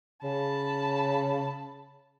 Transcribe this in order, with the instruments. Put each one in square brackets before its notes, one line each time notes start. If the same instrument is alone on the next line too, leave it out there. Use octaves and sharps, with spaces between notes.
[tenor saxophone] C#3 [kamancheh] A5 B5